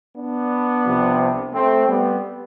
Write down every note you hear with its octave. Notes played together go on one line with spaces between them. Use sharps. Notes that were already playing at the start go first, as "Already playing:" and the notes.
B3 D4
C2 C3 F3
A3 C4
G3 B3